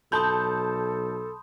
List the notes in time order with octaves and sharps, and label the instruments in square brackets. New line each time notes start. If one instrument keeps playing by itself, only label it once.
[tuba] B1 [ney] A4 [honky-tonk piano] A5 G6 [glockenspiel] B5 C6 D#6